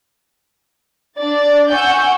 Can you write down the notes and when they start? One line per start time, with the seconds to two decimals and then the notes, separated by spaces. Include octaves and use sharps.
1.19 D4 D5 A6
1.72 F#5 G#5 C#6 E6 G6